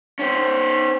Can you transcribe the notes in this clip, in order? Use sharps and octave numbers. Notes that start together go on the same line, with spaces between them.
C#4 C5